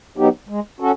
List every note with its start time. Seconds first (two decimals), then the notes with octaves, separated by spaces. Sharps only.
0.17 F#3 B3 D#4 G4
0.49 G#3
0.80 C#4 F#4 A4